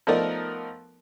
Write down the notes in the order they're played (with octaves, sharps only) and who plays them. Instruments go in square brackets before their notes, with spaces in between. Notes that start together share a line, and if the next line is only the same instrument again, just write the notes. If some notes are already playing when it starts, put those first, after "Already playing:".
[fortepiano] F3 A3 B3 D#4 A#4 D5